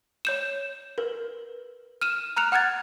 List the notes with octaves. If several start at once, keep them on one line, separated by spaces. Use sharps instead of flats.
C#5 G6 E7
A#4 B4
F6 D#7 E7
A#5 F6 F#6 F7
F#5 F6 F#6 G#6 A6